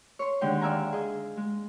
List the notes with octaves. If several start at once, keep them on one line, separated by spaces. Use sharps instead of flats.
C#5 C6
D#2 D3 G#3 G5 C6
D5 E5 F5 G#5 A#5
G#4 D#5
G#3